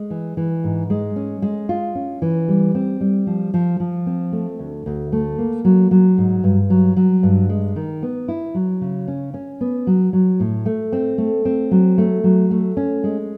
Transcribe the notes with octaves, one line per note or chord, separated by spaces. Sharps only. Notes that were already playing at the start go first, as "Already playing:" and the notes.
Already playing: G#3
E3
E3
G#2
G#3
C#4
G#3
F4
C#4
E3
G3
C4
G3
F3
F3
F3
C4
A3
D2
D2
A3
A#3
F#3
F#3
G#2
G2
F#3
F#3
G2
G#3
D#3
B3
E4
F#3
C#3
C#4
C#4
B3
F#3
F#3
A2
A3
C4
A3
C4
F#3
A3
F#3
A3
C#4
G#3